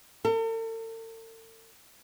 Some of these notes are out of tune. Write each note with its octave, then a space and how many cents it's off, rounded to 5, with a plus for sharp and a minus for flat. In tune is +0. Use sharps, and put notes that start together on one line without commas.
A4 +45